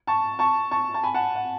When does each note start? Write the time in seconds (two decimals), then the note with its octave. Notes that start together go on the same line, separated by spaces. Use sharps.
0.07 A5 C#6
0.39 A5 C#6
0.71 A5 C#6
0.94 A5
1.03 G#5 B5
1.14 F#5 A5
1.35 F#5